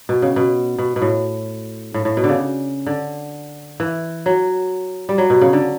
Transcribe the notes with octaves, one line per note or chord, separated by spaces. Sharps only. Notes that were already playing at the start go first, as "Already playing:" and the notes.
B2
C#3
B2
B2
B2
A2
A2
A2
B2
D3
C#3
D3
E3
F#3
G3
F#3
B2
C#3
D3